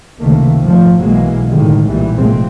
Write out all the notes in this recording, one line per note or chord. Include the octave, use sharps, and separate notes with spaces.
C#2 C3 D#3 A3 A#3
G#1 F2 A#2 F3 A3
B1 B2 E3 F#3 G#3 A#3
A2 D3 D#3 G3 G#3
B1 A#2 E3 G3
F1 A#2 E3 G#3 A3 C4